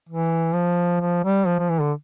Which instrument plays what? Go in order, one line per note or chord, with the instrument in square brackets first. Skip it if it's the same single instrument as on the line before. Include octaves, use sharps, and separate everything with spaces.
[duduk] E3
F3
F3
G3
F3
F3
E3
D3